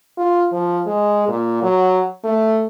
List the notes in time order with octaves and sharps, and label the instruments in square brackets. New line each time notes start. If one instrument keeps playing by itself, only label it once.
[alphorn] F4
F3
G#3
A#2
F#3
A3